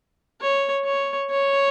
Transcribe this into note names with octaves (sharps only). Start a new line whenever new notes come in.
C#5
C#5
C#5